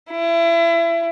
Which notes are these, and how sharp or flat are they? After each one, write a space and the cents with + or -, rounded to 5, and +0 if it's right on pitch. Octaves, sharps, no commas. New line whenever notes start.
E4 +30